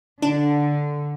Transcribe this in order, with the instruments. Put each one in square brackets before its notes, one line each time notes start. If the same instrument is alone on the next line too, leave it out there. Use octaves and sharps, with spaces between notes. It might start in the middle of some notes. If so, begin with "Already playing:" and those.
[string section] D3 [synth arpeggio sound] D4